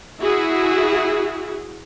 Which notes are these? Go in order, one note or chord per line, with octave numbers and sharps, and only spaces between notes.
E4 F#4 G#4